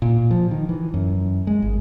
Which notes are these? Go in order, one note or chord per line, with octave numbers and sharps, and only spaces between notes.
A#2
F3
D#3
E3
F#2
G#3
G#1